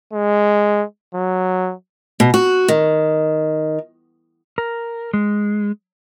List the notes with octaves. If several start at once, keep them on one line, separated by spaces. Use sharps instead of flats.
G#3
F#3
B2
F#4
D#3
A#4
G#3